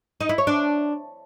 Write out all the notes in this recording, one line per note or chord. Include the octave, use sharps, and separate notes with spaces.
D#4
E4
C#5
D4